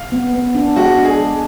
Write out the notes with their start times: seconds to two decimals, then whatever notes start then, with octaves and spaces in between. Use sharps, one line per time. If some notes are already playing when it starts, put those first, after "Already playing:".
Already playing: F5
0.12 B3
0.33 B3
0.55 D4
0.76 G#3 F#4
0.98 D4
1.05 G#4
1.20 G#3